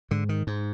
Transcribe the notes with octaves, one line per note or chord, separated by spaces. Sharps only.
G#2 D3
D#3
G#2